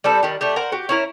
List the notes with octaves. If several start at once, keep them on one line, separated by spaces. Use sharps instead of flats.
G3 C4 A4 B4
D#3 G3
A3 D4 G4
A#4 C5 F#5
F#4 G4
C#4 E4 A#4